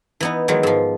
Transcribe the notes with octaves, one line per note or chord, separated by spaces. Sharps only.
E3 B3 D#4
D#3 E3 F#3 G#3
G#2 F3